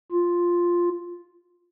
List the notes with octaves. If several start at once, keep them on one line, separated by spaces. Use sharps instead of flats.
F4